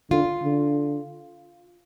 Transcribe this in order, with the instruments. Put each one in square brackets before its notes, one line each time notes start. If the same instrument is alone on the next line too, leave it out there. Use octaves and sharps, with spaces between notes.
[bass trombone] D3 [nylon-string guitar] F4
[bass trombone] D3